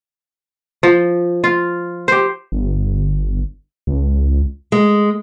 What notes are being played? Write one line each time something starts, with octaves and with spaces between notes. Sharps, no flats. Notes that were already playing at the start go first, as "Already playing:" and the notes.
F3
F4
G4 C5
G1
C#2
G#3